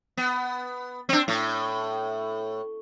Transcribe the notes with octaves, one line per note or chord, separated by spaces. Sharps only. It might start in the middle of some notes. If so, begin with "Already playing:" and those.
B3
C4 D4
A2